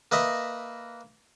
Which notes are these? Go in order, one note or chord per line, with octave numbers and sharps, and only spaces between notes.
A#3 B4 D#5 E5